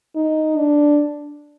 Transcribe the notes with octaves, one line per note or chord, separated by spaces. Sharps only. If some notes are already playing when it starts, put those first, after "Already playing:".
D#4
D4